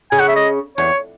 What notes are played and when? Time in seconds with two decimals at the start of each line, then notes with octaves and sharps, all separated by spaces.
0.11 C#3 G#5
0.20 F#5
0.28 E5
0.36 D#5
0.78 E2 C#5